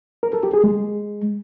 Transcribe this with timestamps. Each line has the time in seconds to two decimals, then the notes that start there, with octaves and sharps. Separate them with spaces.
0.23 A#4
0.33 A4
0.43 G4
0.54 G#4
0.64 G#3